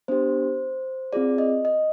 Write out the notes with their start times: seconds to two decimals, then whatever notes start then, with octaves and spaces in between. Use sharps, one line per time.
0.08 B3 D4 G4 C5
1.13 C4 F4 G#4 D5
1.38 D#5
1.65 D#5